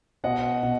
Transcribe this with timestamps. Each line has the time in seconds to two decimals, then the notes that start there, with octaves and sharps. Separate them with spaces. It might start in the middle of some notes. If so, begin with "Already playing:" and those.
0.24 B2 D#5 F#5
0.63 B2